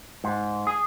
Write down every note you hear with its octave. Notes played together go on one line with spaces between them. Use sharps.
G#2
G#4